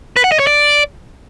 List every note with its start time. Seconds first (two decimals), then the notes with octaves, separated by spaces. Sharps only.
0.16 B4
0.24 F#5
0.32 D#5
0.39 C#5
0.47 D5